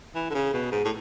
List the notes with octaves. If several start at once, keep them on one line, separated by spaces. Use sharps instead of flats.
E3
D3
C#3
B2
G#2
A2